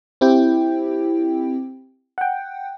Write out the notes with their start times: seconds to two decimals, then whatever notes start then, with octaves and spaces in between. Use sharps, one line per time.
0.21 C4 E4 G4 G5
2.18 F#5 G5